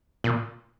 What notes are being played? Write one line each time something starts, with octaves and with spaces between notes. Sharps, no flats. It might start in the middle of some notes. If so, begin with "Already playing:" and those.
A#2